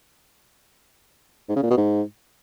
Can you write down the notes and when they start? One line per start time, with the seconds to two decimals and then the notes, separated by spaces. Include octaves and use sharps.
1.49 G#2
1.56 C#3
1.63 A#2
1.70 B2
1.78 G#2